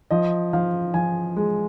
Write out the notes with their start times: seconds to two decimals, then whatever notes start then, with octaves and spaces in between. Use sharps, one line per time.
0.11 F3 D#5
0.53 F3 F5
0.94 F3 G#5
1.37 G#3